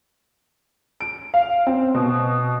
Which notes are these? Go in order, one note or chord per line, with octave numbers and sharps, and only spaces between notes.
D7
F5
C4
B2